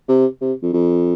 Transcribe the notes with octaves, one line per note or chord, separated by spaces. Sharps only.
C3
C3
F2
F2